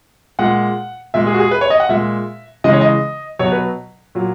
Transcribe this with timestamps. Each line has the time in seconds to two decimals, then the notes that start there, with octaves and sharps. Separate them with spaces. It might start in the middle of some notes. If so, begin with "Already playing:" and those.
0.39 A#2 G#3 F#5
1.14 A#2 G#3 E5
1.27 G#4
1.34 F#4
1.40 G#4
1.51 B4
1.61 C#5
1.70 D#5
1.80 F#5
1.89 A#2 G#3 E5
2.64 C#3 E3 G#3 D#5
2.73 C#5
2.81 D#5
3.39 B2 F#3 C#5
3.52 B4
4.15 A#2 F#3